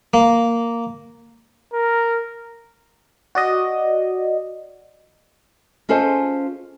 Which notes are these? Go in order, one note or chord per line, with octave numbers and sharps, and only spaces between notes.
A#3
A#4
F#4 D5 D#5
C#4 F4 G#4 A4 C5 D#5